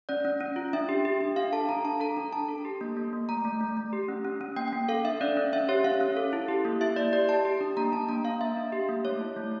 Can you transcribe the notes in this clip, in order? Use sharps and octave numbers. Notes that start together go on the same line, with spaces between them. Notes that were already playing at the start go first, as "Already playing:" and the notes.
C#4 D5
C#4
C#4
F4
D4 E5
G4
G4
D4
D4 F5
A4 A5
D4 A#5
D4 A5
A4 A#5
D4
D4 A5
A4
G4
A#3
A#3
A#3
A3 A#5
A3
A3
A3
G4
C#4
C#4
C#4
A#3 G5
A#3 G5
A4 F5
D4 E5
C#4 D5
C#4
C#4 E5
G4 C#5
C#4 F5
C#4
A4
E4
G4
A#3
E4 E5
A#3 D5
G4 D5
G4 A5
G4
D4
A#3 A#5
D4 A5
A#3 A#5
A#3 F5
A#3 E5
D4
G4
A#3
A3 C#5
E4
A3